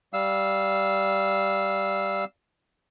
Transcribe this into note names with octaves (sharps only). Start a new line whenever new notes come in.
G3 F5 E6